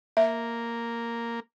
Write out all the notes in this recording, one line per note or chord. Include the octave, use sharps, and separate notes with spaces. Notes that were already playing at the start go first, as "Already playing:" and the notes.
A#3 E5